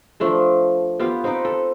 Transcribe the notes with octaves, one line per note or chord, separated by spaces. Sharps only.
F3 A3 D4 A4
B3 F4 G4
C4 D#4 B4 D6
A4